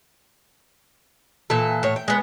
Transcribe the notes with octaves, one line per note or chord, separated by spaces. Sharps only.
A#2 E3 A4
A2 C#5
G5
G#3 B3